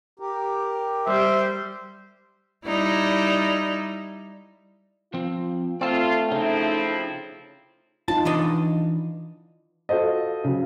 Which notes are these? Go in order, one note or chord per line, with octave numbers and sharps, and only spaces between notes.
G4 A#4
G3 C5 E5
G3 D#4 E4
F3 C4 F4
A3 C4 F4 D5 A5
C#3 F3 C4 D#4 E4
D#4 F4 A5
E3 D4 D#5
F4 F#4 A4 C5 D#5
C#3 F#3